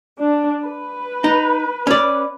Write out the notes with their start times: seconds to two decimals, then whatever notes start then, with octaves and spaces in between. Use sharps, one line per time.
0.18 D4
0.63 B4
1.24 D#4
1.87 C#4 D5